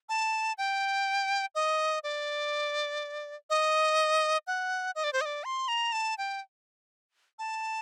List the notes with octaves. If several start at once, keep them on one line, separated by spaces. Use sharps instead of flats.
A5
G5
D#5
D5
D#5
F#5
D#5
D5
C5
D#5
D5
C6
A#5
A5
G5
A5